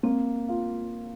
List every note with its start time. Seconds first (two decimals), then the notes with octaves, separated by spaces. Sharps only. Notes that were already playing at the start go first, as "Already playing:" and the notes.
0.03 A#3 C4
0.49 F4